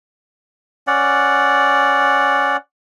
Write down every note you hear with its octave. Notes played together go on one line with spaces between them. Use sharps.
C#4 D5 F#5